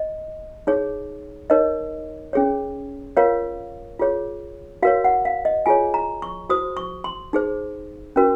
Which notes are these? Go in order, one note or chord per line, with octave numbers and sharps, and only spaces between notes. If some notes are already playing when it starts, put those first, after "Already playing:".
Already playing: D#5
D#4 G#4 C#5
D#4 A#4 C#5 D#5
C#4 G#4 C#5
F4 A#4 C#5 F5
F4 G#4 C#5
F#4 A#4 C#5 F5
F#5
F5
D#5
F4 G#4 C#5 G#5
A#5
C#6
F#4 C5 D#6
C#6
C6
D#4 G#4 C5
C#4 F#4 A#4